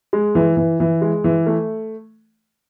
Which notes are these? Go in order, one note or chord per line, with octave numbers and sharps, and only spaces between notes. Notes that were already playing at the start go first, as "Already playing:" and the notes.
G#3
E3
E3
E3
G#3
E3
A3